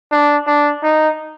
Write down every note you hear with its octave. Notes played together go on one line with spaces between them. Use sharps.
D4
D4
D#4